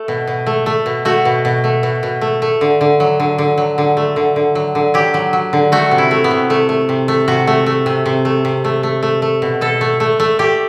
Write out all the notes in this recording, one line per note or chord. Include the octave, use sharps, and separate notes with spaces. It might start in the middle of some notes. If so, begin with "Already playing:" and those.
Already playing: A3
B2
B2
A3
A3
B2
A3 F#4
B2
B2
A3
B2
B2
A3
A3
D3
D3
F#3
D3
D3
F#3
D3
A3
D3
D3
F#3
D3
F#3 G4
F#3
F#3
D3
A3 F#4
C3
E4
A3
B3
C3
C3 A3
A3
C3
A3
C3 F#4
A3
A3
C3
C3
A3
C3
A3
A3
A3
A3
B2
B2 A4
A3
A3
A3
A3 G4